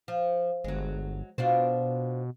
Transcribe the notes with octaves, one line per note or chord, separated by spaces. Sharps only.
F3
G1 F#3 G#3
B2 C4 D4 F4